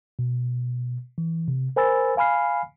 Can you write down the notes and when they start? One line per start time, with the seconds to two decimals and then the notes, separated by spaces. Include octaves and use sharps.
0.19 B2
1.18 E3
1.48 C3
1.76 A#4 C5 G#5 B5 E6 A6
2.17 F5 G#5 B5 F6 C7